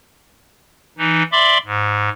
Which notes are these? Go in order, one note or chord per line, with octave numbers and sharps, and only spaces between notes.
E3 D#4
D5 E5 B5 C6 D6
G#2